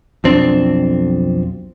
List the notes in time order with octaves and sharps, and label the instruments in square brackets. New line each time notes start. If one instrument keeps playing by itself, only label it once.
[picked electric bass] B1 F2 C4 D4